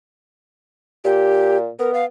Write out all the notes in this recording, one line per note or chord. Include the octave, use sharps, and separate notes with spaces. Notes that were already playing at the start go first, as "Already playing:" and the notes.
A#2 G4
B3 A#4
F5